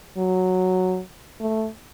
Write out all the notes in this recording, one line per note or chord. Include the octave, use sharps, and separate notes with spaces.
F#3
A3